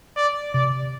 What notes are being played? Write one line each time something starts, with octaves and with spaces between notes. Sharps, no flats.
D5
C3 D5